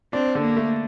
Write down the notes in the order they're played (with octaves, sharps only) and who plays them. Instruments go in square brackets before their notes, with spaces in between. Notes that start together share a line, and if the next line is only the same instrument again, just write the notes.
[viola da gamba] C4 [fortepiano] D4
[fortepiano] D3
[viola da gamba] A#3
[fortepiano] A3